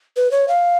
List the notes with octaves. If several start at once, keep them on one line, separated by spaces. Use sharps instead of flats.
B4
C#5
F5